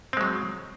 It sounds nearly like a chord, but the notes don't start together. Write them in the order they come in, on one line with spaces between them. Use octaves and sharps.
C4 G#3 F#3